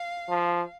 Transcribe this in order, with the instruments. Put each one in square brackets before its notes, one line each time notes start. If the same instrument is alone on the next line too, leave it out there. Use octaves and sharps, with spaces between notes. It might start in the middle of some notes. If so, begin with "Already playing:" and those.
Already playing: [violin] F5
[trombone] F3